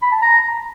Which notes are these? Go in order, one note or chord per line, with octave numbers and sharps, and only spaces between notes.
B5
A5
A#5